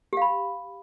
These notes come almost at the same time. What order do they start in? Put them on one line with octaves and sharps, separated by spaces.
G4 F5 B5